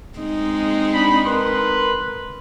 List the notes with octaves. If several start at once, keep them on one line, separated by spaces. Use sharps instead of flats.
G#3 C4 D#4
D4 B5
A#4 B4 C6